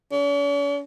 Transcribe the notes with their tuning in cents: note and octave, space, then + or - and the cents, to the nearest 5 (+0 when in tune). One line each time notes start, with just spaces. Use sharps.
C#4 +45